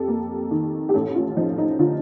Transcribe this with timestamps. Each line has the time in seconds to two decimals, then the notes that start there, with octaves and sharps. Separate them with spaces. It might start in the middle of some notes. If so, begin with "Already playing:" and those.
Already playing: F2 G4 A4
0.08 A#3
0.51 D#3
0.89 G4
0.94 A1 A4
1.15 F4
1.37 F3 D#4
1.58 D#4
1.79 D3 F4